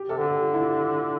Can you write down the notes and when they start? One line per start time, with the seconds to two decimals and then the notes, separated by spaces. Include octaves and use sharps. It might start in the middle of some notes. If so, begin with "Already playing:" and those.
Already playing: G4
0.09 C3 A4
0.18 D3
0.25 G4
0.42 F4
0.53 E4
0.64 F4